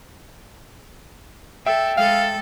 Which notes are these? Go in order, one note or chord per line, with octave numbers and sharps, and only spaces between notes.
A4 E5 G5 E6
G#3 A4 F5